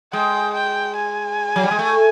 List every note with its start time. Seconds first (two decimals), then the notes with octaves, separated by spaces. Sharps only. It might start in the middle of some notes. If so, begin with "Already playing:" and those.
0.13 G#3 G5
0.54 G5
0.96 G#5
1.56 F#3
1.63 G3
1.71 G#3
1.79 A3